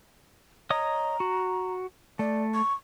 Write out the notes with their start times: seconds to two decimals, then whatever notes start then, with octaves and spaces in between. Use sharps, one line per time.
0.70 C#5 D#5 A#5 D#6
1.20 F#4
2.19 A3 D5
2.54 C#6